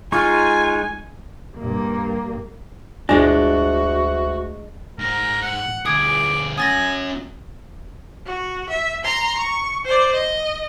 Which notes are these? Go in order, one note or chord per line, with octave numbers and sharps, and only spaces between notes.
G#3 D#4 F4 G#5 C#6
G2 A#3
D2 G2 G#3 D4 F#4
G#2 A#4
F#5
D2 G#4 D6 D#6 G#6
C#4 F#4 G#5 D#6 A6 A#6
F#4
E5
A#5 C6
C#6
C5 D5
D#5